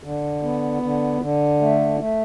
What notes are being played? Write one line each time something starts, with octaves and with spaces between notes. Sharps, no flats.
D3
B3
D3
D3
A3
A3